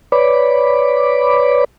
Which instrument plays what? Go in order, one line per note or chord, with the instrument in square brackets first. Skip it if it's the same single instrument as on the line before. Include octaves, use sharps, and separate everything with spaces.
[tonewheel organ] B4 C#5 D5 B5 D6